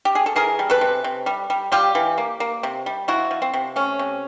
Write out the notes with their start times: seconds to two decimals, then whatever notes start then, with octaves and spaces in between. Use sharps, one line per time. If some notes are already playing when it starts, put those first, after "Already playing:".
0.05 G4
0.15 G#4
0.26 A4
0.36 E3 G#4 A#4
0.59 G3
0.70 A4 B4
0.81 C3
1.04 C3
1.26 G3
1.50 G3
1.72 G3 F4 G4
1.95 E3
2.18 A#3
2.40 A#3
2.63 C3
2.86 G3
3.08 F3 E4 F#4
3.31 F3
3.42 C4
3.54 C3
3.76 A3 C#4
3.99 C3